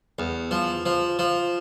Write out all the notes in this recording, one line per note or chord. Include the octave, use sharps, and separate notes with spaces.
E2
F3
F3
F3